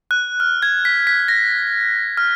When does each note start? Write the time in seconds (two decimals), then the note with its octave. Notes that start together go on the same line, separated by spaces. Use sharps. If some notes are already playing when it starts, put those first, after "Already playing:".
0.11 F#6
0.40 F6
0.62 G#6
0.85 B6
1.07 B6
1.28 A#6
2.18 F6